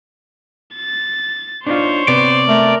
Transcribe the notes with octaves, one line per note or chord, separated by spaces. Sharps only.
A6
D4 D#4 F4 C5 C#5
C3 B3 D5
A3 A#4